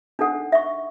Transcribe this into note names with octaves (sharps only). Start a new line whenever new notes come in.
D4 D#4 A4 F#5
E5 C#6